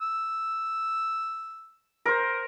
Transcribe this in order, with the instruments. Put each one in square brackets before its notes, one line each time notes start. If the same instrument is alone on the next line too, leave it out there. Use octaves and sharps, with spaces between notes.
[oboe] E6
[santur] A#4 C5